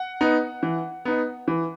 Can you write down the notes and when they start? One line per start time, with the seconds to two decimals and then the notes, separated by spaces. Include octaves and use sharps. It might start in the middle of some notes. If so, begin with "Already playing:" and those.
Already playing: F#5
0.21 B3 D#4
0.63 E3
1.05 B3 D#4
1.48 E3